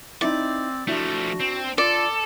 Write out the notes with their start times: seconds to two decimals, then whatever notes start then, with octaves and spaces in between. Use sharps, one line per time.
0.21 C4 D#4 E4 D5
0.88 F3 A3 D4 E4 F#4 A5
1.40 C4
1.78 F4 A4 D5